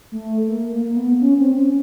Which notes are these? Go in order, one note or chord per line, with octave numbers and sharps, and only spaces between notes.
A3
A#3
A#3
A#3
B3
C#4
C4
C#4